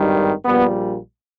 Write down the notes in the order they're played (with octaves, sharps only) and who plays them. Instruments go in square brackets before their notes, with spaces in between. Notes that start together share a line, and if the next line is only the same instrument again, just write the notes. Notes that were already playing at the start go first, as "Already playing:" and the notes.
Already playing: [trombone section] G#1 G2 D#3 G3
A#1 A#2 G3 B3